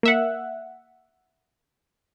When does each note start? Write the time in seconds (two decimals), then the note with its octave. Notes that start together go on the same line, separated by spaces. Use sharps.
0.03 A#3 E5 F#5